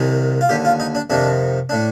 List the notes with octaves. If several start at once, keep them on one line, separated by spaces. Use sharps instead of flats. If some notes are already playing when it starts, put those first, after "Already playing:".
Already playing: C2 C3 D#3
F4
D#2 D3 G4
F4
D#4
D4
F2 C3 D#3 D4
A2 D4